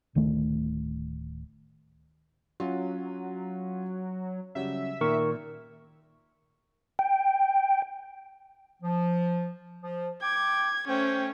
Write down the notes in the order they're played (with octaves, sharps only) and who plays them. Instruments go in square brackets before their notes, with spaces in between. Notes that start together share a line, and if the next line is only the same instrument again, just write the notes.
[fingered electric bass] D1 D#3 A3
[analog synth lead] F#3 [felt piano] C#4 F4
[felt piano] C#3 F#3 G3 [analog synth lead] E5
[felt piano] A#2 [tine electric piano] D#3 A#4 C#6
[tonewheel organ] G5
[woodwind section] F3
F3
[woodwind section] G5 D6 [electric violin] G#6
[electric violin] A3 C#4 [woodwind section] C5 G5